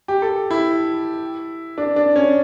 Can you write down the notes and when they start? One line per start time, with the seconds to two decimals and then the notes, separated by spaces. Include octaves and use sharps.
0.08 G4
0.22 A4
0.51 E4
1.78 D4
1.96 D4
2.16 C#4